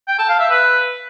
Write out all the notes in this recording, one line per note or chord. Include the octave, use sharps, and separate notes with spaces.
G5
A5
F5
E5
B4